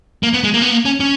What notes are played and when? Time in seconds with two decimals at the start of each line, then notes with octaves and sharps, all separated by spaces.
0.23 A#3
0.34 B3
0.44 G#3
0.54 A#3
0.62 B3
0.71 A#3
0.85 C#4
1.00 C#4